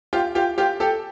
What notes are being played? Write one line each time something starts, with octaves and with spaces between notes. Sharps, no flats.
F4 G4
F4 G4
F4 G4
G4 A4